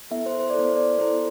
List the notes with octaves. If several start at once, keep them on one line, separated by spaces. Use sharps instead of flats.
B3 E4 A4 E5
C5
C5
D5
B3 E4 A4 C5
D5
B3 E4 A4 C5